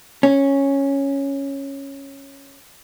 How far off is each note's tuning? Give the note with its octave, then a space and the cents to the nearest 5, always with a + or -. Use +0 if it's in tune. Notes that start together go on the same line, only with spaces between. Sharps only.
C#4 -5